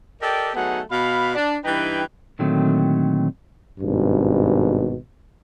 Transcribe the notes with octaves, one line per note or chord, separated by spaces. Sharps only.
G4 A4 A#4 D5 D#5 G5
F#3 A3 B3 D#4 G#4 F#5
B2 F5 B5
D4
G2 E3 D#4 B4 G5
A#2 D3 D#3 F#3 A3 C4
G#1 G2 B2